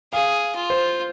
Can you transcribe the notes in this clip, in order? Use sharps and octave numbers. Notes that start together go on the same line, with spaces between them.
G#4 F5
F4
C5